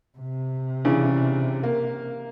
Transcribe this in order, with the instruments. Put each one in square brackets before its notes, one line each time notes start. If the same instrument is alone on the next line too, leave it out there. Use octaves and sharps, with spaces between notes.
[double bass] C3
[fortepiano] C#3 E3 D4
A#3